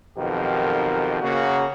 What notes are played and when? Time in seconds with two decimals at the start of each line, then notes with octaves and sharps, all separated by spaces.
0.17 B1 F2 B2 D#3 G4 A#4
1.22 C#3 A#3 F#4